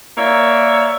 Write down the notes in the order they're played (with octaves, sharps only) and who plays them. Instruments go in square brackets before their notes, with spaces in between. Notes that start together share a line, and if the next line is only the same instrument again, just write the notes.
[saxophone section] A#3 A#4 C#5 D5 E5